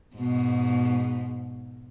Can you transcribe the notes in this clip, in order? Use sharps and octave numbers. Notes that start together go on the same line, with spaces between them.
G#2 B2